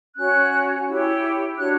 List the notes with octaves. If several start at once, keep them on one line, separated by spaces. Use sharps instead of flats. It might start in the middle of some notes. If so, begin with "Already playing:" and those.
C#4 F#4 C#5 F#6
E4 G4 C#5
D4 F#4 C#5 F#6